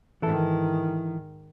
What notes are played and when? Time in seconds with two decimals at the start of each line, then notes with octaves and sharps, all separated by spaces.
0.22 G#2 D#3 E3 E4 A4